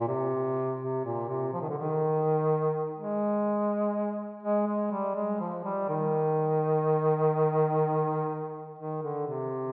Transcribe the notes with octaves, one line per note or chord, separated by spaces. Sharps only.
A#2
C3
C3
A#2
C3
F3
D#3
D3
D#3
G#3
G#3
G#3
G3
G#3
F3
G3
D#3
D#3
D3
C3